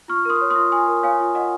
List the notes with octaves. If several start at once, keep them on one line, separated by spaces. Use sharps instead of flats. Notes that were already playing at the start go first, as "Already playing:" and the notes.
F4 C#6 F6
A#4 C6 D#6
C#5
C6 D#6
F4
F4 G#5 C6
A#4
C#5 F5 G#5
F4
F4 D#5 F#5